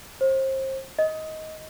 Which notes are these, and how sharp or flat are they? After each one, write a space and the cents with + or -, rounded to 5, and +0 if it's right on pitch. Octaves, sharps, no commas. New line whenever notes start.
C5 +30
D#5 +15